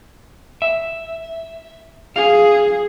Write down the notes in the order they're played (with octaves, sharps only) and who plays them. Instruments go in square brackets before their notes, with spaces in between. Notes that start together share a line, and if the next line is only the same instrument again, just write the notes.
[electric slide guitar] E5
[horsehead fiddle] G#4 [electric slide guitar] F5